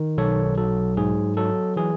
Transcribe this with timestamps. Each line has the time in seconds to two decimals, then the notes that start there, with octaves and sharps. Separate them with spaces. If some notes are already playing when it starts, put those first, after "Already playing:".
Already playing: D#3
0.18 B1 A4 C#5
0.58 F#3 A4
0.97 G#2 G#4
1.37 F#3 A4
1.76 E3 G#4